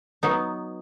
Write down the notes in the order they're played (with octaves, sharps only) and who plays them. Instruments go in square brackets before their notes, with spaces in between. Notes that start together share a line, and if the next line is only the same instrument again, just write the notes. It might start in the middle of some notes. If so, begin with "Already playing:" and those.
[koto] F#3 B3 D#4